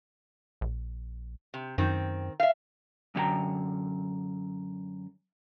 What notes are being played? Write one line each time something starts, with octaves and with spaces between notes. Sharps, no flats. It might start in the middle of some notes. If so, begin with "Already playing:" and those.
A#1
C3
F#2 D#3 C4
E5 F5
F#2 D3 E4 F4 G5 A#5